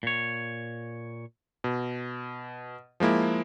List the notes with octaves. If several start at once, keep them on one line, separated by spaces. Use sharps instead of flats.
A#2 C#5
B2
F3 G#3 A#3 E4